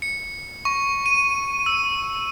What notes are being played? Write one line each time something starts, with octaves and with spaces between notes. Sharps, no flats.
C#7
C#6
D#7
E6